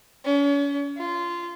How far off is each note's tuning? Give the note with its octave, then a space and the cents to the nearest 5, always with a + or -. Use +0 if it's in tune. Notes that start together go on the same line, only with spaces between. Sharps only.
C#4 +40
F4 -15